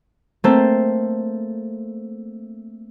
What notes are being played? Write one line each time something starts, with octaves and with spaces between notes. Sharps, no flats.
A3 A#3 C4 A4 C5